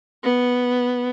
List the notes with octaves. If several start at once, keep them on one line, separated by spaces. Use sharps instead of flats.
B3